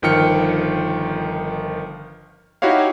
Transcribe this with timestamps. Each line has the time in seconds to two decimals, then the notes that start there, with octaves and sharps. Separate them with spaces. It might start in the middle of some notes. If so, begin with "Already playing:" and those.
0.02 G1 D#3 F3 G5 F6 C#7
2.62 D#4 E4 F#4 G4 C#5 F5